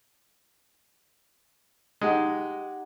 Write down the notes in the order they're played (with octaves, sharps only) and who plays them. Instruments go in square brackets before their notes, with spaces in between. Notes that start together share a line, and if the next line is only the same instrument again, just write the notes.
[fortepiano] G#3 [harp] D#4 G4 F#5